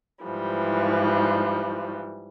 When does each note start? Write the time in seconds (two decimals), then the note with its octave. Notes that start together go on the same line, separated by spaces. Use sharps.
0.24 G#2 E3 F3 G3